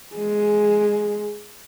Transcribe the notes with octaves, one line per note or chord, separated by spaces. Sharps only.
G#3 G#4